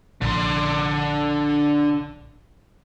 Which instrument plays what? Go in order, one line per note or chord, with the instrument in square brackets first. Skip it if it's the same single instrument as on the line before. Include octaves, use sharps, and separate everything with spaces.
[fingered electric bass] A#1 [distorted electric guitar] D3 C6